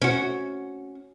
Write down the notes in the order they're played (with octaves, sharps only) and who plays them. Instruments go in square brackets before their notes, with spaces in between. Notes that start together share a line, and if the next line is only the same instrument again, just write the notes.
[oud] C#4 F#4